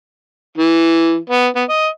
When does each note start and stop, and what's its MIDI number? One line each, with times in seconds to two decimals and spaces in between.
0.58 1.16 52
1.30 1.46 59
1.56 1.64 59
1.69 1.86 75